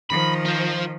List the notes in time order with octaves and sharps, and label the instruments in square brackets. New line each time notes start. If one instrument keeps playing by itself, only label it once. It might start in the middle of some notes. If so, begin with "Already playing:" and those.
[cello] D#3 F3 [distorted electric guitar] B5
[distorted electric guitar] F4 C5